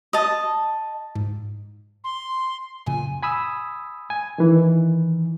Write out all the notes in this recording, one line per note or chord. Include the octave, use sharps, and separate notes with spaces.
D#5 A5
G#2
C6
F#2 A#2 C#3 G#5
G#5 B5 D#6 E6
G#5
D#3 E3